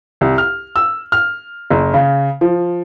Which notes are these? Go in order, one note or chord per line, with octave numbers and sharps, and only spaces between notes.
C2
F6
E6
F6
F#1
C#3
F3